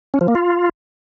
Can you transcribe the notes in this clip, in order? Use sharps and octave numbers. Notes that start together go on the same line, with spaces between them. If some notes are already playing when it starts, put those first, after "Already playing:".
C#4
F3
A#3
F4